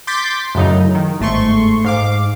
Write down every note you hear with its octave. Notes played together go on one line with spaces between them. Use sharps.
C6 D6 G6 A6 B6
F#2 A2 C#3 F#3 D#4
D#3
G1 G#2 A3 C6 C#6
G#2 F5 D6